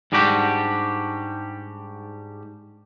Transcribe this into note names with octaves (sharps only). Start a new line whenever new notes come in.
G#2 G3 D4 F#4 G4